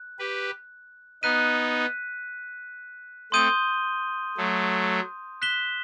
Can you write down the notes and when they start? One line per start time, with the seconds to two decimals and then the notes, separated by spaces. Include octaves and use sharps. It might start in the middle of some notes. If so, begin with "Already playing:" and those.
Already playing: F#6
0.19 G4 B4
1.23 B3 D#4 F#6 B6 D#7
3.32 A3 C4 C6 D#6 G6 D#7 G7
4.37 F#3 A3
5.42 F#6 B6 E7 G7